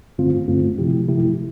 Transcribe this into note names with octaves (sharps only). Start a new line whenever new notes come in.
G2 D3 A3 C4 F4
G2 D3 A3 C4 F4
C3 F3 A3 E4 G4
C3 F3 A3 E4 G4